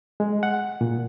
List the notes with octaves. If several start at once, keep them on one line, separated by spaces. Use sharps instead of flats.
G#3
F#5
A#2